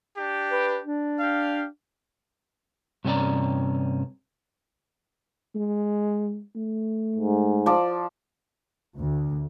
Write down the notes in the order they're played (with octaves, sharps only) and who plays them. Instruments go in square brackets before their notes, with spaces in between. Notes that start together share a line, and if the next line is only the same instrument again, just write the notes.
[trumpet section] D4 G4
[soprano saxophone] B4
D4
[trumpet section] G4 F5
[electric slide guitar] G2 C3 C#4 G4 D5 A#5
[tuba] G#3
A3
[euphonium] G#2
[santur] F3 D5
[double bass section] D2